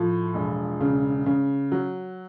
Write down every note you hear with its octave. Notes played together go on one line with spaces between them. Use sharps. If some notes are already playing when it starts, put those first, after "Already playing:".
Already playing: A2 F3
E1
C#3
C#3
F#3